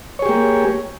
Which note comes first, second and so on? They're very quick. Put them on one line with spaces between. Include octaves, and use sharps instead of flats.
C#5 G#4 G4 A#3